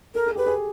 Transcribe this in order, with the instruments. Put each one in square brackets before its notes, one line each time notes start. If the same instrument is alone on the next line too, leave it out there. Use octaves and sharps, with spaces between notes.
[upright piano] A4 [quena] A#4
[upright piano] G#4
[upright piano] G4 [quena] B4
[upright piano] G#4